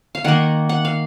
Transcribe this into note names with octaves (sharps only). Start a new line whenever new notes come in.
F5
D#3 A#3 F#5
F#5
F5